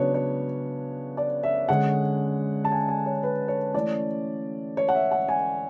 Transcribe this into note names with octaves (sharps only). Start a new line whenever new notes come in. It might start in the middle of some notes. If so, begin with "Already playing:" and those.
Already playing: C#3 F#3 B3 D4 C#5
C#5
D5
E5
D3 G#3 C#4 F#5
A5
G#5
G#5
C#5
B4
C#5
E3 A3 C#4 D5
C#5
F#5
E5
F#5
G#5